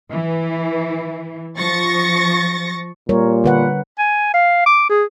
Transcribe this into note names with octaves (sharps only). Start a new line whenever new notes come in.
E3
F3 C#6 A6 A#6
A#2 G3 A#4 C#5
D3 B4 F#5
G#5
F5
D6
G#4